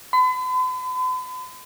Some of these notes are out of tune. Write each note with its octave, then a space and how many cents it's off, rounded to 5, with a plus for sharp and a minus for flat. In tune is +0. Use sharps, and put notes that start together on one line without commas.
B5 +45